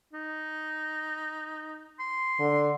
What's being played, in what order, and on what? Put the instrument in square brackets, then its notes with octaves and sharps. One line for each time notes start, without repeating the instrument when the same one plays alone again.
[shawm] D#4
C6
[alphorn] D3